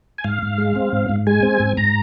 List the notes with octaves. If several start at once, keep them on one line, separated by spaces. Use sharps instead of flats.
G#5
G#2 F5
G#2
G#3
C4
G#2
G#2
G#3 G#5
C4
G#2
G#2 A#5